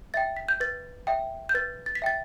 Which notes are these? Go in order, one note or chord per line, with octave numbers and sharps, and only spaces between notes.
E5 G5 A6
B6
G6
B4 A6
E5 G5
G6
B4 A6
A6
B6
E5 G5 A6